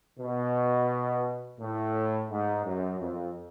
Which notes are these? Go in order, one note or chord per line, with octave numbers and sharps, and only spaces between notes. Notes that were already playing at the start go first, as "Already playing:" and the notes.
B2
A2
G#2
F#2
F2